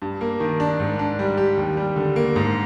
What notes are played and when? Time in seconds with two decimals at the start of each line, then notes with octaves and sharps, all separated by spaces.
0.02 G2
0.21 A#3
0.40 D#3
0.60 D4
0.79 G#2
0.99 D4
1.19 G3
1.37 G4
1.57 D#2
1.77 G3
1.96 D3
2.16 A#3
2.36 G#2